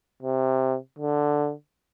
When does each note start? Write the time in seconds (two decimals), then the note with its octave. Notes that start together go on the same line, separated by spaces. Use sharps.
0.23 C3
0.99 D3